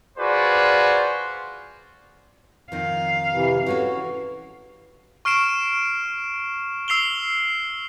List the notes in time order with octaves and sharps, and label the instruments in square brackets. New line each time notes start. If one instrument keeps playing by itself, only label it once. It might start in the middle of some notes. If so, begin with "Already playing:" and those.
[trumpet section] F4 F#4 G#4 B4 C5 D5
[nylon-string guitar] F2 D#3 [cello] F5
[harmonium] C3 E3
[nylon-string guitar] E3 C#4 A4 [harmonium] F#4
[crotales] C#6 F6 C7 D7 E7
E6 C7 F7 G7